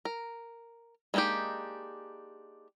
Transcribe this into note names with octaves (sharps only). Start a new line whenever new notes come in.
A#4
G#3 A#3 D4 D#4 G4